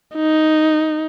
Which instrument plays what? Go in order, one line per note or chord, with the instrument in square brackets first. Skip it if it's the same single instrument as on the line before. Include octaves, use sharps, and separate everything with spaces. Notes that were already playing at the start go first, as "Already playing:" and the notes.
[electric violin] D#4